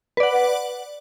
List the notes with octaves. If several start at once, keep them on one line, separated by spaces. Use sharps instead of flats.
B4 D5 F#5